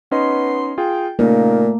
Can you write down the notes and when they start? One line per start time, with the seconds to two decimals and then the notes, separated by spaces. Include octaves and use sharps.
0.11 B3 C#4 D#4 D#5 C6
0.78 F4 G#4 G5
1.19 A#2 C#3 A3 A#3 D#4 A#4